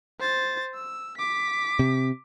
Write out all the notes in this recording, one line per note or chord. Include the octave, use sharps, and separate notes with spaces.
C5 A6
E6
D6 B6
C3